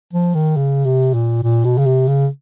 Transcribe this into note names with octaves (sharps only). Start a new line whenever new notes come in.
F3
D#3
C#3
C3
A#2
A#2
B2
C#3
C3
C#3